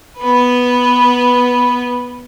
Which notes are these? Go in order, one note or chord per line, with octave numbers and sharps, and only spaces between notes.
B3 B4